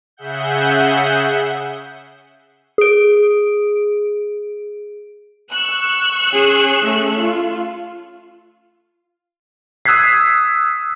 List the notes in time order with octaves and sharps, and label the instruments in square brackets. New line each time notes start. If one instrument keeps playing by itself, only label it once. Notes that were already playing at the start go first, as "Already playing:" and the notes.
[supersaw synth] C#3 G#4 E5 F#5 G6
[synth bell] G#4 D7
[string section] C#6 E6 F#6
[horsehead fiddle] C#4 G#4
A3 C#4
F4
[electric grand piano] D#6 E6 F#6 G#6 B6 C7